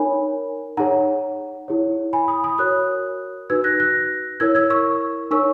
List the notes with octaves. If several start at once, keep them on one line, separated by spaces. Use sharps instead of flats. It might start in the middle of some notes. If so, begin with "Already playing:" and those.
Already playing: D#4 A#4 C#5 G#5 B5
D#4 G#4 C#5 F#5 A#5
E4 G#4 C#5
G#5 B5
B5 D#6
B5 D#6
F#4 A#4 C#5 D#6 F#6
D#4 F#4 B4 E6 G#6
F#6 A#6
F#6 A#6
E4 A#4 C#5 E6 G#6
E6 G#6
C#6 E6
D#4 A#4 C#5 C#6 E6